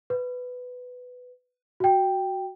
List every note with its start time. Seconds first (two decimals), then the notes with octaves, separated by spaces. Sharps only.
0.10 B4
1.80 F#4 G5